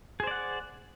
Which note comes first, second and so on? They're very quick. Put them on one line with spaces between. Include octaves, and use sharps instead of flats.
G#4 C5 D5 F#5